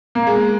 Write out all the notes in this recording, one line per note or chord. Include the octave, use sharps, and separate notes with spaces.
A#3
G#3